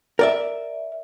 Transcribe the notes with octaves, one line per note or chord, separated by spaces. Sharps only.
A#4 D5 E5